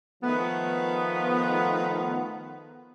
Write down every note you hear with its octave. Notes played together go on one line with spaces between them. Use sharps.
D#3 F3 A3 B3